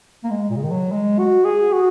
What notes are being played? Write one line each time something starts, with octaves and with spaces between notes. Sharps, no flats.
A#3
G#3
A#2
C#3
D#3
F#3
G#3
F#4
G#4
F#4